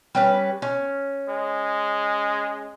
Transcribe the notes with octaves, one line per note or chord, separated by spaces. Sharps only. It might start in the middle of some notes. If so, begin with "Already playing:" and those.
G3 C#4 B4
C#4
G#3